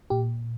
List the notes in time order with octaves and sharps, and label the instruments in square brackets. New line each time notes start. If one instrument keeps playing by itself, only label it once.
[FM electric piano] A#2 G4